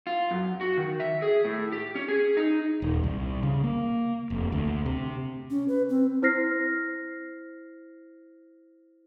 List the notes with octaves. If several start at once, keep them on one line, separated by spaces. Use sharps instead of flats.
F4
F#2
F#4
D#3
E5
G#4
A2
G4
C#4
G#4
D#4
D#1
C2
C#3
A#3
F1
D2
C3
C#4
B4
C4
E4 C5 F6 A#6 C7